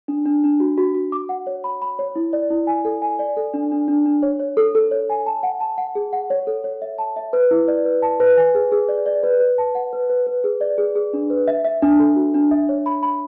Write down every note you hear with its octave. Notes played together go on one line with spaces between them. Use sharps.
D4
D4
D4
F#4
F#4
F#4
D6
F#5
C#5
B5
B5
C#5
E4
D5
E4
G#5
A4
G#5
D5
A4
D4
D4
D4
D4
C#5
C#5
A4
A4
C#5
G#5
A5
F#5
A5
F#5
G#4
F#5
C#5
A4
C#5
E5
A5
E5
B4
E4
D5
B4
A5
B4
G#5
G#4
G#4
D5
D5
B4
B4
A5
F#5
B4
B4
B4
G#4
D5
G#4
G#4
D4
B4
E5
E5
D4
A4
F#4
D4
E5
C#5
B5
B5